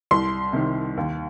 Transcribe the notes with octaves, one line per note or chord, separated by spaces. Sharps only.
C2 C6
C3 D#3
D#2